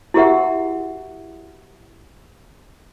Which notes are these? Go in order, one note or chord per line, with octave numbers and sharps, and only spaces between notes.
E4 F#4 G4 A#4 E5 F#5